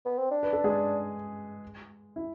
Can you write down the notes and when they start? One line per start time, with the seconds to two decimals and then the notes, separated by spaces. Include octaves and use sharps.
0.05 B3
0.18 C4
0.31 D4
0.43 B4
0.53 A4
0.64 G#3 G#4
2.16 E4